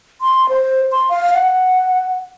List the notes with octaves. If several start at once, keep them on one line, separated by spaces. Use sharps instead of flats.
C6
C5
C6
F5
F#5